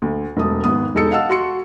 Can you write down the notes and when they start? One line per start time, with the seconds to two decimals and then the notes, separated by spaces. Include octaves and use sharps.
0.02 D2
0.37 E1 A3 D#6
0.64 G#1 B3 D#6
0.95 E1 G#3 D#4 A4 E6 C#7
1.11 D#5 F5 F#5 A5 E6
1.29 F#4 C6 C#7